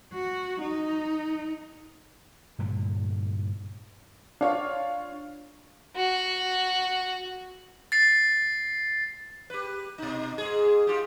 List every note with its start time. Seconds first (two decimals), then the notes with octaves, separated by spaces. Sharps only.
0.14 F#4
0.61 D#4
2.59 G2 A#2 D3 A3
4.41 D4 F4 C#5 F5
5.96 F#4
7.92 A6 C7
9.50 G4 B4
9.98 B2 D#4
10.38 G#2 G#4
10.87 F4 G4